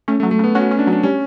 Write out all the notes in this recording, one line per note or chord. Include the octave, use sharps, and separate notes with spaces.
A3 C#4
A3
F#3
A3
C#3 B3
C#4 F#4
C#4
D4
F#3
D4
G3 C#4